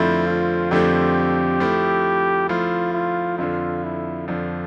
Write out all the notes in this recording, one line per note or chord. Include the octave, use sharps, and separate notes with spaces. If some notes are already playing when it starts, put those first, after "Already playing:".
Already playing: F2 D3 F3 A3 C4 E4
F4
F2 D3 F3 A3 C4 G4
F3 A3 E4
F3 A3 E4 F4
F4
F2 D3 F3 F4
E4
F2 D3 F3 D4